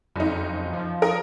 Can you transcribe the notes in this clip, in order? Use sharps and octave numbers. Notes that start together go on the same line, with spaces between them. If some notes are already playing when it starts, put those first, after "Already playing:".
F#1 F2 D#4
F3
A4 A#4 D#6